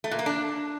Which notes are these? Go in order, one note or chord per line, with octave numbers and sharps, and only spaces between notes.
A3
A#2
A#3
D4